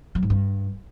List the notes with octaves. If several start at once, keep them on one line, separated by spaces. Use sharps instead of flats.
F#3
G#2
G2